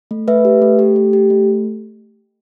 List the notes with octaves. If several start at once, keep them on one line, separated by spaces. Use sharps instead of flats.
A3
A3 B4 E5
G4
A3
G4
A3
G4
A3